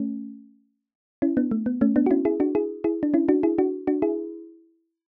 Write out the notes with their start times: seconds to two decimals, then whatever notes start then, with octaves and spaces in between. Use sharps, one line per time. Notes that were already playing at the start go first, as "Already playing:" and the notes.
Already playing: A3 C#4
1.22 C#4 E4
1.37 B3 D4
1.51 A3
1.66 B3
1.81 A3 C#4
1.96 B3 D4
2.06 F#4
2.11 C#4 E4
2.25 E4 G#4
2.40 D4 F#4
2.55 E4 G#4
2.84 E4 G#4
3.03 D4
3.14 C#4 E4
3.28 D4 F#4
3.43 E4 G#4
3.58 D4 F#4
3.87 D4 F#4
4.02 E4 G#4